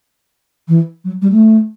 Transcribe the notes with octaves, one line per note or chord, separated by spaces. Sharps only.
E3
F#3
G3
A3